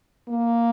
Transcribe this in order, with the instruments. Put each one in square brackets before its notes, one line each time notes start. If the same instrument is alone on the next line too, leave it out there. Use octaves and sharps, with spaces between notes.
[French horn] A#3